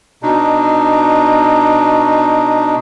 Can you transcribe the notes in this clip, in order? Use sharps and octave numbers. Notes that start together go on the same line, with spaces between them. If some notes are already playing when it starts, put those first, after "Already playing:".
B2 D4 D#4